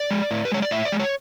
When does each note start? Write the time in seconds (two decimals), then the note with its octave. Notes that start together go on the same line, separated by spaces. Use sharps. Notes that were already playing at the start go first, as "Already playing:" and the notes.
Already playing: D5
0.11 G#3
0.31 A2
0.45 B4
0.52 G#3 C#5
0.62 D5
0.71 A2 E5
0.85 D5
0.92 G#3
0.99 C#5